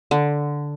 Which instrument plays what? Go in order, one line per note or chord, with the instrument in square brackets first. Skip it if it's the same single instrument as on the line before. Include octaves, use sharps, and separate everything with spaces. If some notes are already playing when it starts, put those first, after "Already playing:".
[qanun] D3